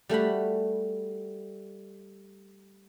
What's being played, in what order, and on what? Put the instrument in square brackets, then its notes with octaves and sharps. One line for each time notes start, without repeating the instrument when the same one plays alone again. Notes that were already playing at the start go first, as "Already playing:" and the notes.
[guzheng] G3 A3 F#4 B5